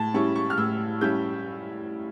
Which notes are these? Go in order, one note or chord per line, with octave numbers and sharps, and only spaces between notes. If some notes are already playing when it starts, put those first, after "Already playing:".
Already playing: A2 A5
G3 C#4 E4 C#6
C#6
F6
A2 E6
G3 C#4 E4 G6